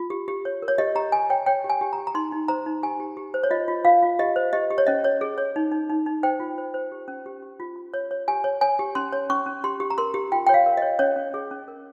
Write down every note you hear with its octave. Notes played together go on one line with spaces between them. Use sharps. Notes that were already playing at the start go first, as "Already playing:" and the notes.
Already playing: F4
G4
G4
C#5
A#4
C#5
G4 D#5
G4 A#5
G4 G#5
C#5 G5
C#5 G5
G4
G#5
G4
A#5
G4
A#5
D#4 C6
D#4
C5 A#5
D#4
G4 G#5
G4
G4
C5
C#5
F4 D#5
F4
F4 F5
F4
G4 D#5
C5
G4 D#5
G4
C#5
C#4 D#5
C#5
G#4
C#5
D#4
D#4
D#4
D#4
C5 G5
F4
C5
C5
G4
C#4
G4
G4
F4
F4
C#5
C#5
G4 G#5
C#5
C#5 G#5
G4
C#4 C6
C#5
C#4 C#6
C#4
G4 C6
G4
A#5
A#4 C6
G4
F4 G5
G5
C#5 F5
A#4
D#5
C#5
C#4 C#5
C#4
G#4
C#4
A#4